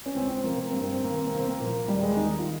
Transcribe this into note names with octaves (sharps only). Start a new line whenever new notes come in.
C#4
C#2 C4
C4
C3 F3 A#3
A#3
G2 C4
A#3
C4
D#3 A#3
C4
C2 A#3
C4
A#3
A#2 F3
D#2 G3
G#3
D#3 D#4
F4